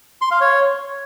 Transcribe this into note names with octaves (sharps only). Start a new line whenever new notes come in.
C6
F5
C#5